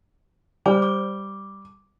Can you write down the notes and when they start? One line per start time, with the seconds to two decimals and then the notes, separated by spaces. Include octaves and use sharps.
0.66 G3 C5 D5 D6
0.82 D6